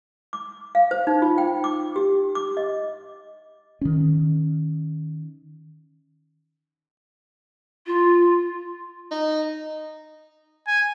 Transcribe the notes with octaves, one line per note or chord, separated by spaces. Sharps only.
D6
F5
C5
D#4
F4
G5
D6
G4
D6
D#5
D#3 C#4
F4
D#4
G#5